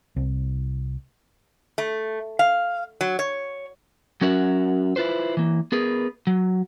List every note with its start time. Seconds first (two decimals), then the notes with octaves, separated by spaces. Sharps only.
0.16 C2
1.78 A3
2.39 F5
3.01 F#3
3.19 C#5
4.21 F#3 C#4 F#4 A#4 E5 F#5
4.96 E4 F4 B4 C5
5.37 E3 A#3
5.72 B3 G#4 A#4 B4
6.27 F#3